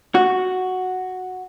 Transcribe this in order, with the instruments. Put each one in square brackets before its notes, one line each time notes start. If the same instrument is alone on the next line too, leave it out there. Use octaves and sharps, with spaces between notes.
[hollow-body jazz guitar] F#4